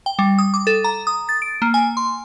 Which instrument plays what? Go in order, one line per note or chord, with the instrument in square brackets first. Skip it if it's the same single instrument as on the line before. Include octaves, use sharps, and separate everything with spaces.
[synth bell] G5
G3
D#6
D6
A4
A#5
D#6
A6
D7
A#3
G#5
C6